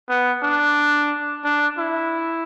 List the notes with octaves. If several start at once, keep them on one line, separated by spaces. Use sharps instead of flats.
B3
D4
D4
E4